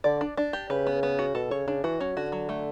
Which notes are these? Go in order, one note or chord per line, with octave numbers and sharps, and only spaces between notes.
D3 D5
D4
D4
G4
C#3 B4
B3
B3
F#4
B2 A4
C#3 C#5
C#3 D4
E3 F#4
F#3 C#4
D3 F#4
F#3
A3